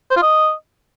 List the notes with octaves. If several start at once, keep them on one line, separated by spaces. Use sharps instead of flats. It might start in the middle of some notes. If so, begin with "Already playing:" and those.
C5
F4
D#5